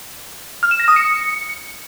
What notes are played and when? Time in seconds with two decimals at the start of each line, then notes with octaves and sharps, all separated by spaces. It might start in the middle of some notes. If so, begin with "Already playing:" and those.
0.63 F6
0.71 E7
0.80 A#6
0.88 D#6
0.96 C#7